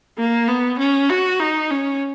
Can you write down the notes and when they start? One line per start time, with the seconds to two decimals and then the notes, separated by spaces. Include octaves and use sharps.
0.18 A#3
0.48 B3
0.79 C#4
1.09 F#4
1.39 D#4
1.70 C#4